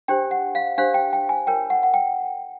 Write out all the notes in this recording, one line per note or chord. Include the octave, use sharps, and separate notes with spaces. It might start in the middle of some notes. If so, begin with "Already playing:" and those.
D4 G4 C5 G5
F#5
F5
D4 G4 C5 F5
G5
G5
G#5
F4 A#4 C#5 G5
F#5
F#5
G5